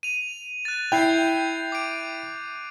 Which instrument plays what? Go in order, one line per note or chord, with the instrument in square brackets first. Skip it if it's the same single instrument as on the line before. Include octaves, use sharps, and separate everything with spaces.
[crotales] D#7 F7
F#6 A6
[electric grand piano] E4 G5 [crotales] G6 C7 F7
[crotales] D6 D7